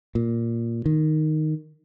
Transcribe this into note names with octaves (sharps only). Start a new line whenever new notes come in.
A#2
D#3